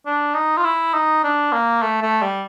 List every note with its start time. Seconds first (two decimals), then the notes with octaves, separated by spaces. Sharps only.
0.06 D4
0.34 D#4
0.57 F4
0.64 E4
0.94 D#4
1.24 D4
1.52 A#3
1.82 A3
2.02 A3
2.22 G3